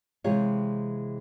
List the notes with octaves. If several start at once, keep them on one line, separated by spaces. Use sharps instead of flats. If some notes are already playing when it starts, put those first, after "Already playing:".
C3 E3 G#3 G4 C#5 F5